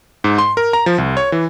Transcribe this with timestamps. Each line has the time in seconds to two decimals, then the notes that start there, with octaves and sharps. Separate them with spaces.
0.24 G#2
0.38 C6
0.57 A#4
0.73 A#5
0.86 F3
0.98 C2
1.17 C#5
1.32 E3